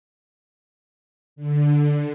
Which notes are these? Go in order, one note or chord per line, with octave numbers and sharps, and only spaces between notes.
D3